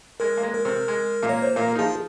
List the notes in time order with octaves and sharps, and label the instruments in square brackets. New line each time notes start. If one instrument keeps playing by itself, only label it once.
[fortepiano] G#3 [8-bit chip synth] A#4
[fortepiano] A#3
G#3
[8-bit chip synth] A#4
[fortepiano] C3 C4
G#3
A#2 A#3
[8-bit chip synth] C#5
C5
[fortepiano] A#2 A#3 [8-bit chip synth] A#4
[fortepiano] D#4
[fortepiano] F3 F4 [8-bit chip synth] G#4